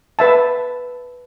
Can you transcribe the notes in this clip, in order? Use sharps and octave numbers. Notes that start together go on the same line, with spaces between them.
B4 E5 A5